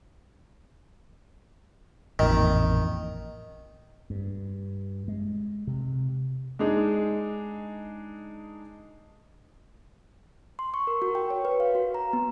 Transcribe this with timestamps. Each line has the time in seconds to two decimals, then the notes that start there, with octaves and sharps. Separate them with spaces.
2.19 A1 F2 A#2 D#3
4.10 G2
5.08 G#3
5.67 C3
6.59 G#3 D4 D#4 G#4
10.59 C6
10.74 C#6
10.87 A#4
11.02 F#4
11.15 G5
11.30 C#5
11.45 B4
11.60 F5
11.75 F#4
11.94 A#5
12.13 B3